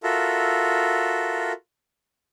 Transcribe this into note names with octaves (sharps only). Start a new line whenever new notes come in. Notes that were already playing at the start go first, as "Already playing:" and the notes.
F4 F#4 A4 A#4 E5